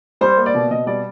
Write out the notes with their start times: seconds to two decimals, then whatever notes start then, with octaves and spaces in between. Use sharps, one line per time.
0.21 G3 C5
0.37 A#3
0.46 D5
0.55 B2
0.71 B2 D#5
0.87 G3 D5